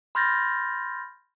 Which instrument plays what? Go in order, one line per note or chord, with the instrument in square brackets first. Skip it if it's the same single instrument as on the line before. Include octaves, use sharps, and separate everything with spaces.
[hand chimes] B5 C6 F6 G6 A6 A#6